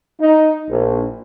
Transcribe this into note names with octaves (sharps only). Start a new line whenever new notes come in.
D#4
A#1